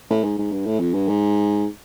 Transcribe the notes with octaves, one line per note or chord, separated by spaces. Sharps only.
A2
G#2
G#2
G2
A2
F2
G2
G#2